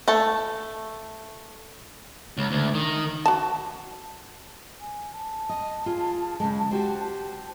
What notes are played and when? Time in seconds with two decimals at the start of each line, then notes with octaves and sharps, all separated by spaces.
0.08 A3 A4 A5
2.38 C#2
2.51 D2
2.75 D#3
3.26 F#4 A5
4.81 G#5
5.12 A5
5.49 D#5
5.86 F4 G#4
6.40 C#3 G#3
6.71 F#4 G4 C5